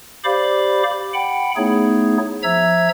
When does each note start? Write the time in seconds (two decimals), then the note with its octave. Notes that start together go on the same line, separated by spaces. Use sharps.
0.24 G4 C5 D5 F5 B5 D6
1.14 F#5 G5 B5
1.57 A3 B3 D#4 E4 G#4 C#5
2.43 F3 E5 A#5 E6 G#6